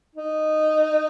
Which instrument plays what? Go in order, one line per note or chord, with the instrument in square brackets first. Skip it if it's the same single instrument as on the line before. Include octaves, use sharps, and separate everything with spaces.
[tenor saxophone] D#4